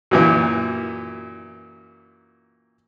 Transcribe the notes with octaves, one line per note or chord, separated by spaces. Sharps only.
F#2 A#2 E3